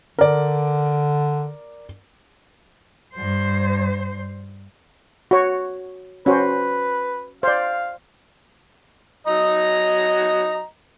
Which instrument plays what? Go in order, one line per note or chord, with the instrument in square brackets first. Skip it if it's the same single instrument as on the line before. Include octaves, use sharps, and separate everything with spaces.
[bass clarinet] D3 [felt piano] A#4 D5
[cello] G2 C5
[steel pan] F#4 C#5
[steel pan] C#4 F#4 C5 [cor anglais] B4
[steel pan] C5 D5 [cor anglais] F5
[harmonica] F#3 D#5 A#5